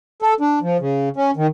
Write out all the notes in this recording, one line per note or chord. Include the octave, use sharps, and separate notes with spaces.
A4
D4
F3
C#3
C#4
D#3